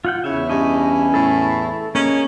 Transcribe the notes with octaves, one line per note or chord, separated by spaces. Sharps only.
F4 F#5 G5
E2 C#3 E4 C#5 E5
G2 C#4 D#5
A2 A4
A#3 C#4 G#4 D#5